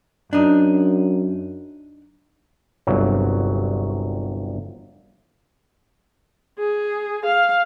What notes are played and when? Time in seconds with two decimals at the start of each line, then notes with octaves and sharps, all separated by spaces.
0.33 F#2 D4 D#4
2.87 G1 C2 F#3
6.59 G#4
7.26 F5